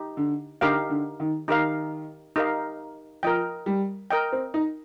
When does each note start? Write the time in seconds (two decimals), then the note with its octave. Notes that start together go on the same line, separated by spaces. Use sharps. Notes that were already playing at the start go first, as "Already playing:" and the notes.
Already playing: D#4 G4
0.17 D3
0.61 D3 D#4 G4 A#4 F5
0.90 D3
1.20 D#3
1.48 D#3 D#4 G4 A#4 F5
2.36 D#4 G4 A#4 F5
3.23 F3 A#4 D#5 G5
3.66 G3
4.10 A#4 D#5 G5
4.32 C4
4.54 D#4